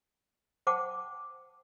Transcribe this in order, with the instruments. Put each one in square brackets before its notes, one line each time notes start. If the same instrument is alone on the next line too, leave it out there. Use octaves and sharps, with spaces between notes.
[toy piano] C5 F#5 G5 A5 D6